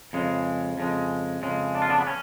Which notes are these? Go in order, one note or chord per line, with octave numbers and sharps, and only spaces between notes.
F2 C#3 G#3
F2 C#3 G#3
F2 C#3 G#3
D4
F4
B3 D4
B3
C#4